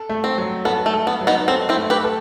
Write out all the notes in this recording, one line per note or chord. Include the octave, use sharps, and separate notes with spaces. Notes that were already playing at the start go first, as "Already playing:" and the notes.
Already playing: A4
A3
C4
F#3
B3 A4
A3
A4
B3
F#3
B3 D#4
C4 A4
C4 E4
A3
G4 B4
A4